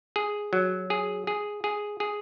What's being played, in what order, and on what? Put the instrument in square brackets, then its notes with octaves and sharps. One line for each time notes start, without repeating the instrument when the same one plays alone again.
[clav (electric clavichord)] G#4
F#3
G#4
G#4
G#4
G#4